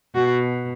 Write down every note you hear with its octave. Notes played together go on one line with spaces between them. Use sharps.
B2 F#4